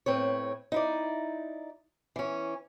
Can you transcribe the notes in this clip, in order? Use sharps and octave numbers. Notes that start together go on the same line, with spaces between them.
A2 C4 B4 C#5
D#4 E4 D5
E3 C#4